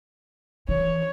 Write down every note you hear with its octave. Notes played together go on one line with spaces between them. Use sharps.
E3 C#5